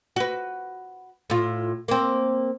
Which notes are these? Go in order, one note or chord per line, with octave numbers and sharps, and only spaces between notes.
F#4 B4
A2 F4
A#3 C4